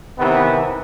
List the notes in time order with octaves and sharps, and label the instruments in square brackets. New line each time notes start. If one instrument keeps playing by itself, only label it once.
[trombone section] C3 D#3 E3 B3